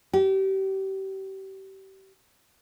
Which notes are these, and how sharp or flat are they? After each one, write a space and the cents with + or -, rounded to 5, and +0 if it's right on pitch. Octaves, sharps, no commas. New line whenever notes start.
G4 -30